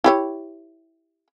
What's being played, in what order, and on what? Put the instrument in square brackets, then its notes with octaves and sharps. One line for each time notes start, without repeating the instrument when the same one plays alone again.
[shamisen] E4 G4 C#5